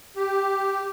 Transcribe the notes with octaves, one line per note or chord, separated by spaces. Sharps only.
G4